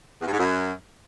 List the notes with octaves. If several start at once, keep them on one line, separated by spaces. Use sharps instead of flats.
E2
G2
G#2
F#2